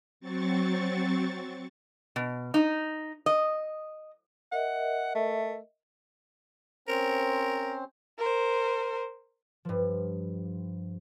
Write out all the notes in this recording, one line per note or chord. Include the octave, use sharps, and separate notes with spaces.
F#3 C4 C#6 A6
B2
D#4
D#5
A#4 D#5 E5 F#5
A3
C4 C#4 A#4 C5
A#4 C5
G2 F3